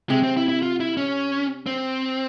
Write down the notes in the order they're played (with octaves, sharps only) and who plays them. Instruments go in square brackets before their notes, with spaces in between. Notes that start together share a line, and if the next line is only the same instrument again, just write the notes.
[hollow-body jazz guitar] C3 [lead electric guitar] G#3
[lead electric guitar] C4
E4
E4
F4
E4
C#4
C4